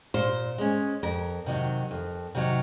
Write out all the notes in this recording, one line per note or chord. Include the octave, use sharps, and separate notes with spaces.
A#2 C5
G#3 C#4
F2 A#4
C3 D#3 F#3
F2
C3 D#3 F#3